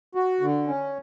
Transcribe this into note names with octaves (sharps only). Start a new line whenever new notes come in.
F#4
D3
C#4